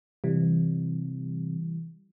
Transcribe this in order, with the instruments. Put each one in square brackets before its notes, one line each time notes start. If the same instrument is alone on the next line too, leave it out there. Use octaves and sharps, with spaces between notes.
[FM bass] C3 [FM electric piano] E3 G3